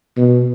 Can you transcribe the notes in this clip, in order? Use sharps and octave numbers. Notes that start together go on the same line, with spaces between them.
B2